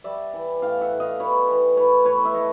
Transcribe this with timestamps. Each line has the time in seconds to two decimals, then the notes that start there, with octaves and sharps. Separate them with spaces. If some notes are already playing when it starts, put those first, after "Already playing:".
0.04 G3 D5 E5
0.33 E3
0.62 A2 F5 G5
0.81 E5 F#5
0.91 A2
1.00 D#5 F5
1.19 G3 B4 C#5
1.49 E3
1.76 A2 B4 C#5
2.05 A2 B4 C#5
2.25 E5
2.34 A3 C#5 D#5